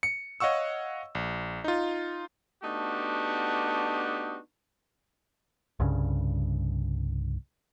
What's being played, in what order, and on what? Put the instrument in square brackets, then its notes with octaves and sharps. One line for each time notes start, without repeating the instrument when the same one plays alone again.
[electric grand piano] C#7
C#5 D#5 F5 F#5 C#6 E6
A#1
D#4 F4
[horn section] A3 B3 D4 D#4 F#4 G4
[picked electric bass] C2 G2 C#3